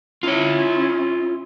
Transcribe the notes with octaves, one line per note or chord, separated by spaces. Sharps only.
C#4 E4 F4 C#5